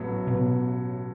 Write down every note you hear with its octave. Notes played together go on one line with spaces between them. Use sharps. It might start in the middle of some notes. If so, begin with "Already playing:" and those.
Already playing: A1 A2 F#3 B3
A1 B2 B3